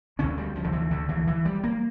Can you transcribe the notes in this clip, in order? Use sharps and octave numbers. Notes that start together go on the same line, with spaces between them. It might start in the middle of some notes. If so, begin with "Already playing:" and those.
D2 D3 C#4
G3
F3
D3
E3
D3
E3
E3
G3
A#3